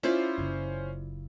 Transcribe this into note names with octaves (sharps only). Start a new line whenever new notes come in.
C#4 E4 F4 C5 D5
F#1 D#4